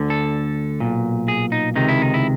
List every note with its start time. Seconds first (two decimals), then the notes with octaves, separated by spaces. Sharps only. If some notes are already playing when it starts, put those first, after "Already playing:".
Already playing: D2 D3
0.10 A4
0.80 B1 A#2
1.28 G#4
1.52 D#4
1.76 C#2 C3 D#3 D#4
1.88 E4
2.02 D#4
2.14 E4